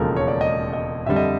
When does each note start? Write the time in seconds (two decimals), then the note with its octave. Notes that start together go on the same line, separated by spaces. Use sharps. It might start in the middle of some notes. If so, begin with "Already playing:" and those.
Already playing: E1 D#2 C#3 F3 G#3 A4 A#4
0.16 C#5
0.28 D5
0.41 D#5
0.73 D#5
1.06 F2 D3 G3 E5
1.16 D#5